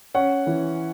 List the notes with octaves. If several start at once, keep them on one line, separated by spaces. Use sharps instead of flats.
C#4 F#5
E3